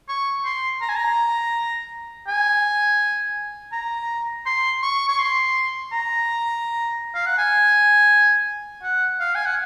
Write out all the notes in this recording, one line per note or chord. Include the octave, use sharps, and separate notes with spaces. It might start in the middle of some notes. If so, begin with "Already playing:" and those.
C#6
C6
A#5
G#5
A#5
G#5
A#5
C6
C#6
C#6
C6
A#5
F5
F#5
G#5
F#5
F5
G#5
F#5